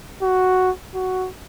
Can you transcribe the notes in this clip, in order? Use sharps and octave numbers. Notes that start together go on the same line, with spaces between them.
F#4
F#4